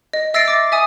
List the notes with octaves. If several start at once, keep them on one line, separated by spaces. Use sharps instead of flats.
D#5
E5 E6 A6 A#6 C7 D7
D6 A6
E5 G#5 D#6